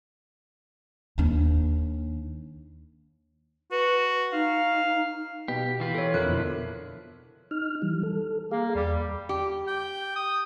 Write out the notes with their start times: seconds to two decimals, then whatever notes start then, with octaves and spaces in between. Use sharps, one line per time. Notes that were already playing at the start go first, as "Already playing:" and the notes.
1.18 D#2 D4
3.72 F#4 B4
4.33 D#4 F5
5.48 B2 G4
5.80 E3 F4 B4
5.95 A4 C#5
6.14 F2 D3 F3 E4 A#4 F#6
6.30 B2
7.51 D#4 F6
7.82 E3 G3
8.03 A4
8.51 A#3 G#4 F5
8.75 E2 G3
9.29 G4
9.67 G5
10.16 D#6